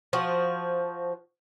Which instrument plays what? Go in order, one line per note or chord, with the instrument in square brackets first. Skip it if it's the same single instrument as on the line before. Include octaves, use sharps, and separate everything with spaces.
[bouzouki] F3 F#4